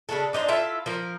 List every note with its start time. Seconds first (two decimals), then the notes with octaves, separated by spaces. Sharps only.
0.09 C#3 D4 F#4 A4
0.33 D4 D#4 B4 C5
0.48 E4 F4 A4 E5
0.86 F3 A#4